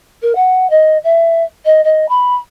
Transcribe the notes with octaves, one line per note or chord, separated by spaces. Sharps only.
A#4
F#5
D#5
E5
D#5
D#5
B5